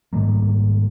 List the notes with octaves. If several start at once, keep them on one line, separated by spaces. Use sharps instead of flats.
G#2 D#3 G3 A#3